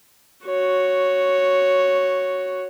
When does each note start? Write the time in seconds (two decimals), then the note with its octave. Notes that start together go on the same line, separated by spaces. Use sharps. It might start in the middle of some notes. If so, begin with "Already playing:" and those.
0.46 F#4 C#5